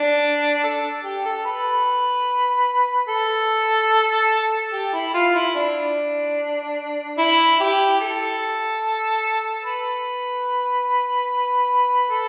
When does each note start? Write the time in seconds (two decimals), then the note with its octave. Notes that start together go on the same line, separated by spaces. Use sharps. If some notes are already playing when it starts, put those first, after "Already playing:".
Already playing: D4
0.63 A4
1.04 G4
1.25 A4
1.45 B4
3.08 A4
4.72 G4
4.93 E4
5.14 F4
5.35 E4
5.55 D4
7.18 E4
7.60 G4
8.00 A4
9.64 B4
12.10 A4